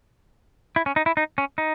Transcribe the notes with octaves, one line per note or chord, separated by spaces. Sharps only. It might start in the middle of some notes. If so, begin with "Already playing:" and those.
E4
C#4
D#4
E4
D#4
C#4
D#4